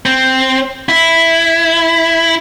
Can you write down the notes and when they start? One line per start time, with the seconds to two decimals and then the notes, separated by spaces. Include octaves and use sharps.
0.06 C4
0.89 E4